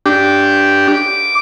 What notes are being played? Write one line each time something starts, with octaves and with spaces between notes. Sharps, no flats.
D4 G4
D6